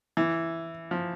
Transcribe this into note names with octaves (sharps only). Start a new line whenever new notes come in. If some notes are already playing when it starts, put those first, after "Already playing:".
E3
F3